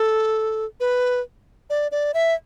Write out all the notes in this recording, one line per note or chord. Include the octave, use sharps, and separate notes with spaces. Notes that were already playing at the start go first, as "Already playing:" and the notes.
Already playing: A4
B4
D5
D5
E5